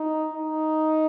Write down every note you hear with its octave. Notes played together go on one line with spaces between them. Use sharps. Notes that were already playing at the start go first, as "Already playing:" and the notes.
Already playing: D#4
D#4